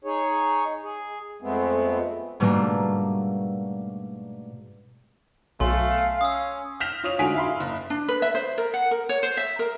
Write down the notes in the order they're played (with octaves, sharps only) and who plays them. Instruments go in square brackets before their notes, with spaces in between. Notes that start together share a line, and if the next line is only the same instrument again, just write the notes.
[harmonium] D#4 G#4 C#5
G#4
F2 G#3 A3 B3 C4
[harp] G#2 B2 G3 A3 A#3 D4
[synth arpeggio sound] B1 [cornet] A3 [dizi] F5 [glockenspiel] G#5 C6
[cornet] C#4 [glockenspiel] D#6 E6
[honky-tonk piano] F6 G6 A#6 B6 E7 F7
F4 C#5 D#6 F7
G#2 D3 F#4 G#5 B6 D7
E5 F5 B5 C6
F#1
[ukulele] D4
B4
E5
C5
A#4
F#5
A#4
C#5
C5
E5
A#4